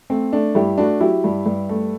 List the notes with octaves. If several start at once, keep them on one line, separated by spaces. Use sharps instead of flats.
A3 C4
A3 D4
G2 E4 G4
A3 D4 F#4
F#3 E4 G4
G2
G2
A3